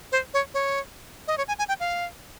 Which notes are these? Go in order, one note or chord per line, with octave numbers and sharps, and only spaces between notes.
C5
C#5
C#5
D#5
C#5
G#5
G#5
G5
F5